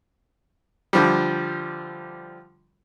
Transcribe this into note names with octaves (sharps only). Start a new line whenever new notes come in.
D3 F3 G3